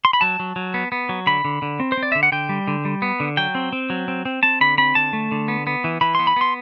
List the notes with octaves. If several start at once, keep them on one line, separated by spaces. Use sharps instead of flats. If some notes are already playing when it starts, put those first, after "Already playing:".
C6
B5
F#3 A5
F#3
F#3
B3
B3
F#3
D3 B5
D3
D3
C4
C5
C4
D5
D3 E5
F#5
D3 G5
G3
D3
G3
B3
D3
F#3 G5
C4
C4
F#3
C4
C4
C4 A5
D3 B5
C4 B5
D3 A5
A3
D3
B3
B3
E3
E3 B5
B3 C6
B5
B3 C6